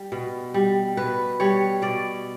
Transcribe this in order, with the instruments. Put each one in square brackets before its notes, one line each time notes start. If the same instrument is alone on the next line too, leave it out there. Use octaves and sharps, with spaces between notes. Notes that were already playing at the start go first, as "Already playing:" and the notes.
Already playing: [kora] G3
B2
G3
B2 B4
G3 C#5
B2 D5